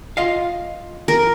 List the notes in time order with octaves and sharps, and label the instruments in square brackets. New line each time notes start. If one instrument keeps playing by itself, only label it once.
[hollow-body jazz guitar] F4 D#5 F5
[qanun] A#4